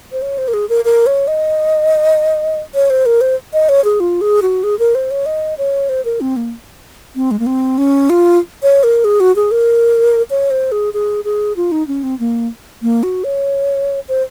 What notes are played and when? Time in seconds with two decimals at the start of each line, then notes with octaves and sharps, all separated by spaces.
0.12 C5
0.22 C#5
0.38 C5
0.48 A#4
0.54 G#4
0.69 A#4
0.85 A#4
1.06 C#5
1.28 D#5
2.75 C#5
2.90 C5
3.06 A#4
3.21 C5
3.53 D#5
3.69 C#5
3.84 G#4
4.00 F4
4.21 G#4
4.42 F#4
4.63 G#4
4.79 A#4
4.95 C5
5.11 C#5
5.26 D#5
5.58 C#5
5.89 C5
6.05 A#4
6.21 C4
6.36 A#3
7.15 C4
7.31 G#3
7.39 A#3
7.46 C4
7.78 C#4
8.10 F4
8.63 C#5
8.84 A#4
9.04 G#4
9.20 F#4
9.36 G#4
9.51 A#4
10.30 C#5
10.51 C5
10.72 G#4
10.94 G#4
11.24 G#4
11.56 F4
11.72 D#4
11.87 C#4
12.03 C4
12.19 A#3
12.82 A#3
13.03 F#4
13.24 C#5
14.08 C5